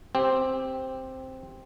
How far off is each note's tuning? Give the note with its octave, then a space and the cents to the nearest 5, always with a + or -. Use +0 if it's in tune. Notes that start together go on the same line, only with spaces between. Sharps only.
C4 +0 G4 +5